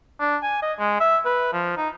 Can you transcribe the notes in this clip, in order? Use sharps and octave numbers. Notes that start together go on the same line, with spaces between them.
D4
G#5
D#5
G#3
E5
B4
F3
D#4